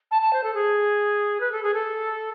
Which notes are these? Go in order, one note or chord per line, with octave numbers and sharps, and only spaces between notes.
A5
A5
C5
A4
G#4
B4
A4
G#4
A4